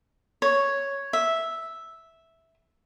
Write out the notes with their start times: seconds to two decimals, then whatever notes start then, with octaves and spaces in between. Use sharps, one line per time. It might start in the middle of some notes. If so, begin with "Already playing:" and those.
0.42 C#5
1.13 E5